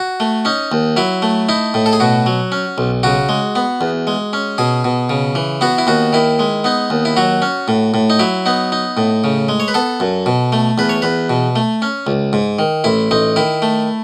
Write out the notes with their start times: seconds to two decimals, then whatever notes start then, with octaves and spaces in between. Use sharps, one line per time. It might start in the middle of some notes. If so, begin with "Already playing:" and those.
Already playing: F#4
0.20 A3
0.45 C#4 D#4
0.72 D#2
0.97 F#3 E4
1.22 A3
1.49 D#4 E4
1.74 A2
1.86 A4
1.93 G#4
2.00 B2 F#4
2.26 F#3
2.52 C#4
2.78 B1
3.03 C#3 F#4
3.29 G#3
3.55 B3
3.81 E2
4.07 G#3
4.33 C#4
4.58 B2 G#4
4.84 B2
5.09 C#3
5.35 E3
5.61 B3 F#4
5.78 E4
5.87 D#2 F#4
6.13 D#3 E4
6.39 G#3
6.64 B3 D#4
6.90 D#2
7.05 E4
7.17 F#3 F#4
7.42 C#4
7.68 A2
7.94 A2
8.10 D#4
8.19 F#3 E4
8.46 B3 D#4
8.72 D#4
8.97 A2
9.24 C#3
9.49 G#3
9.60 C#5
9.68 B4
9.74 B3 A4
10.00 F#2
10.26 B2
10.52 A3
10.78 E2 B4
10.89 C#5
11.02 E2 B4
11.30 B2
11.56 A3
11.82 C#4
12.07 C#2
12.33 G#2
12.59 D#3
12.84 A1 E4
13.11 A1 D#4
13.36 D#3 E4
13.62 A3